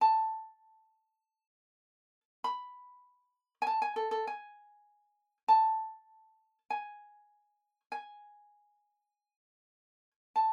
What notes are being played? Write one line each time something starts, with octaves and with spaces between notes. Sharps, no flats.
A5
B5
G#5
A5
G#5
A4
A4
G#5
A5
G#5
G#5
A5